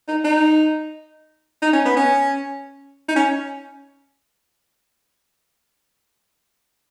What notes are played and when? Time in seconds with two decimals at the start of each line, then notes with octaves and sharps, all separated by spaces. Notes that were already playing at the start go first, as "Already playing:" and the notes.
0.08 D#4
0.24 D#4
1.62 D#4
1.73 C#4
1.85 B3
1.96 C#4
3.08 D#4
3.16 C#4